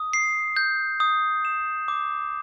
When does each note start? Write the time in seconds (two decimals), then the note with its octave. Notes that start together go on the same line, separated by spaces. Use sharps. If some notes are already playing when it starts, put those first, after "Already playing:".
Already playing: D#6
0.13 C7
0.56 G6
1.00 D#6
1.45 E7
1.88 D6